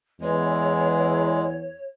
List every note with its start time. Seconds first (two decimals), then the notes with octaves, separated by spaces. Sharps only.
0.21 E2 G#3 C#5